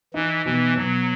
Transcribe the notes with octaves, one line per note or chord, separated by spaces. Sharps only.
E3 D#4
B2 E3
B2 F#3